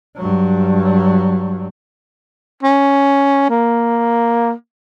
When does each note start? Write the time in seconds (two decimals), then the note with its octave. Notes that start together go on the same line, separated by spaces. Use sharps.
0.16 G2 F#3
2.63 C#4
3.49 A#3